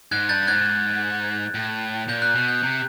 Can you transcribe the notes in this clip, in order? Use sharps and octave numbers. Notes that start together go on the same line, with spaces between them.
G#2 F#6 G#6
G2 G6 A6
A6
G#2 F#6 G#6
A2
A#2 G6
F#6
B2 F#6
G6
C3